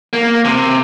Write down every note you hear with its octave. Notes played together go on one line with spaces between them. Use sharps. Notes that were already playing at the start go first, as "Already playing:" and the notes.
A#3
C3